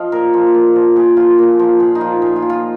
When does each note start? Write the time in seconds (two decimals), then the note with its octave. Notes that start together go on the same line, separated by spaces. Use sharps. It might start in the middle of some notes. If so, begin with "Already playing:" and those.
Already playing: F3 D#5 F5
0.12 A#2 A#4
0.34 F3
0.54 A#2
0.76 F3
0.96 A#2 G#4
1.17 F3 F4
1.39 A#2
1.59 F3
1.80 A#2 G#4
1.95 D#4
2.01 F3 F4
2.22 A#2 G#4
2.36 F4
2.42 F3
2.50 F4